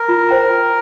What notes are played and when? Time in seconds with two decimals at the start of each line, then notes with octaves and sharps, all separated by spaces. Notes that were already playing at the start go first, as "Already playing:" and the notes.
Already playing: A#4
0.08 F4
0.29 C5 G5 A#5
0.49 F4